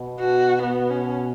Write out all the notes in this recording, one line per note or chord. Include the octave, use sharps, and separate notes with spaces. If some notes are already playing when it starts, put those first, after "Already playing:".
Already playing: B2
F#4
B3
C#4